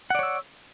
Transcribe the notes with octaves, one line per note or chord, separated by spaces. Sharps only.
C#5 D5 F#5 E6